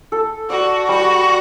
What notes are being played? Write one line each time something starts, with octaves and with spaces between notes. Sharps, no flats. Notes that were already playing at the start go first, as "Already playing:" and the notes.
A4
F#4 D5
G3 F#4